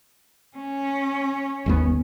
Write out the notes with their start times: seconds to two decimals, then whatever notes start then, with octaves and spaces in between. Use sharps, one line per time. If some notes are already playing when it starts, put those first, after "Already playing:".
0.57 C#4
1.66 G1 D#2 B3